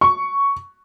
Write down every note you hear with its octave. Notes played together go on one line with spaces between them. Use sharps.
C#6